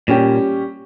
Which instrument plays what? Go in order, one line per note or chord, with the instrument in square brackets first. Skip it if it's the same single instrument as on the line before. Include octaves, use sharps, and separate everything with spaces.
[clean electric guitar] A#2 [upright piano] G3 C#4 G4